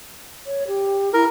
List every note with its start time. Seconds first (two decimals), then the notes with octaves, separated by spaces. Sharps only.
0.47 C#5
0.68 G4
1.13 E4 A#4